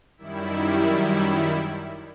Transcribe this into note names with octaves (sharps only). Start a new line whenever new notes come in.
F#2 D#3 G3 E4